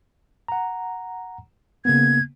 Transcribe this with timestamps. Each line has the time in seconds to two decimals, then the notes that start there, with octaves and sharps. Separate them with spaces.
0.48 F#5 A#5
1.85 C#3 A#3 B3 G#6